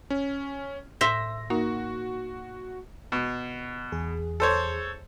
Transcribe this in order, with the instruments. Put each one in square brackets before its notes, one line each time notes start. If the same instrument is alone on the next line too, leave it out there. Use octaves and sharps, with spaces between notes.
[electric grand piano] C#4
[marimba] A2 [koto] C5 E5 [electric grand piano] A#6
[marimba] A#3 D#4 A#4 [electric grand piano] F#4
[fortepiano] B2
[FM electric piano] E2 G#4
[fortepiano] A4 C5 C#5